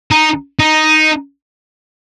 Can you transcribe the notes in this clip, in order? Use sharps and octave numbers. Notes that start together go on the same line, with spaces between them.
D#4
D#4